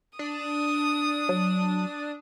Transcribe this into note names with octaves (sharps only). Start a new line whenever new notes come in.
D4 D#6
F#3